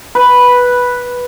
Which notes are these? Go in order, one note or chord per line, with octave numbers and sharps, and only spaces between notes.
B4